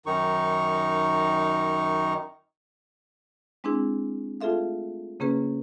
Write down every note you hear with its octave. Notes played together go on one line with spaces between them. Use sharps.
F#2 D#3 D#4 C#6
G#3 C4 D4 E4 G#4
A3 F4 G#4 A4 E5 F5
C#3 A#3 C#4 G#4 B4